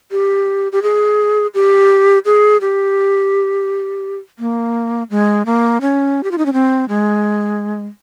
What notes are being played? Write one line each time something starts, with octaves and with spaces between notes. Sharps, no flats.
G4
G4
G#4
G4
G#4
G4
A#3
G#3
A#3
C#4
G4
F4
D#4
C#4
C4
G#3